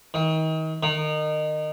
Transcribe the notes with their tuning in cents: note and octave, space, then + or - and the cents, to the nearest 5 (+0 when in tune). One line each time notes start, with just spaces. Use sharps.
D#3 +35
D#3 -25